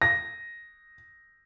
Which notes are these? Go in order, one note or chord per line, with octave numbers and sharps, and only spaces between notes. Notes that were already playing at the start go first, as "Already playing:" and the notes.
A#6